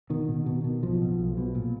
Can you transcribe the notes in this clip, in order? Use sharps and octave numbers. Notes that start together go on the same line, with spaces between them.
B2 D#3
B2
B2
B2
B1 F3
B2
B1
B2
A#2